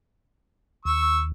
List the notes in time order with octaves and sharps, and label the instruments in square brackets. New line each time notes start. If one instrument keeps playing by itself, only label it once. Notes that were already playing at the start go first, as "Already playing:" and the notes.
[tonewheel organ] D#2 [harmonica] C#6 E6